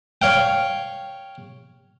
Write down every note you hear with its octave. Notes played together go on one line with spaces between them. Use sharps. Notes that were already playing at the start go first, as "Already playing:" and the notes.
C#5 F5 G5